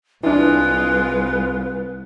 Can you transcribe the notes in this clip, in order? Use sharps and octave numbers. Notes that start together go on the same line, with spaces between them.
C2 E3 G#3 D4 F4 B4